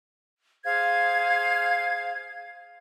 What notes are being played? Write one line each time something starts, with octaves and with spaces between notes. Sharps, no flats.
G#4 C5 F5 G#6